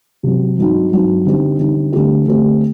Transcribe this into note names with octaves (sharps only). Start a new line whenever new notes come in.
C3 F#3 C4
G2 F#3 C4 D#4 F#4
G2 F#3 C4 D#4 F#4
D3 G3 C4 D#4
D3 G3 C4 D#4
D3 A3 C4 G4
D3 A3 C4 G4